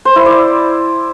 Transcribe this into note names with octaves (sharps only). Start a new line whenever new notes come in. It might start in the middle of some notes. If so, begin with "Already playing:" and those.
C5
E4
D5